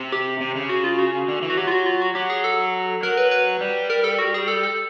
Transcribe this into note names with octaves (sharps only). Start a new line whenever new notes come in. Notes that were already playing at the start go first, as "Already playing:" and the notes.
Already playing: C3
G4
C3
C#3
F#4
F4
F#4
D3
E3
F#4
F#3 G4
F4
F#4
F4
F#4
F#3 G4
G#4
A4
F#3 A#4
B4
B4
G3
A#4
A4
F#4
G#4
A4
A4